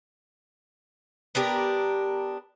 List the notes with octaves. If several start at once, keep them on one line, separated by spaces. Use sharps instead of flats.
B3 D4 G4 A#4